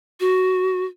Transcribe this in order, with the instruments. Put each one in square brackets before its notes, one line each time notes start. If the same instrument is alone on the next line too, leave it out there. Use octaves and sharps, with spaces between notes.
[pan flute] F#4